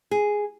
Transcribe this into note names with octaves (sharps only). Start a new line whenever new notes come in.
G#4